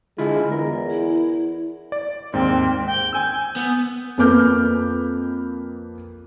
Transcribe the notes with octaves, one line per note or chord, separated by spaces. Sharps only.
D3 G#3 E4 F4
E2 A#4
E4
D5
D#2 G#2 C4
G5
G#5 E6 G6
B3
F2 A#3 B4 D6 F6 G6